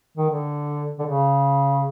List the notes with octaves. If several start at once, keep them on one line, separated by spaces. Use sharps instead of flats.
D#3
D3
D3
C#3